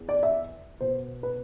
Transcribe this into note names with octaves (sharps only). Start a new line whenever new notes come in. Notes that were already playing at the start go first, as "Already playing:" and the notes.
Already playing: E2
D5
E5
B2 B3 C5
B4